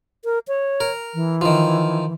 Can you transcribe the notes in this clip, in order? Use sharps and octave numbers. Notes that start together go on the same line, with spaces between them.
A#4
C#5
A#4
E3
D#3 F3